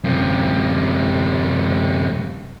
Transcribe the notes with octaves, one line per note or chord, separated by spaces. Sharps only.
F#2 C3